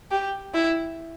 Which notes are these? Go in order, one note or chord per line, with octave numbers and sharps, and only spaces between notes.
G4
E4